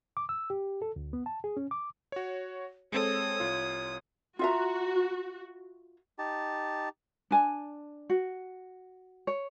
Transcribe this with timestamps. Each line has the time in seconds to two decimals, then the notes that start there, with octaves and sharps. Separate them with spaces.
0.17 D6
0.29 E6
0.50 G4
0.82 A4
0.96 D2
1.13 B3
1.26 A5
1.44 G#4
1.57 C#4
1.71 D6
2.12 F#4 C#5
2.92 G#3 C4 A4 C#5 D#6
3.40 C2 F4
4.39 F4 F#4 E5 A#5
6.19 D#4 G4 A5
7.31 D4 G#5 A5
8.10 F#4
9.27 C#5